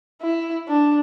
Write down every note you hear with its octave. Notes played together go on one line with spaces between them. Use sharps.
E4
D4